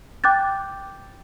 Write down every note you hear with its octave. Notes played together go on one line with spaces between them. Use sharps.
G5 D6 F#6 G6 A6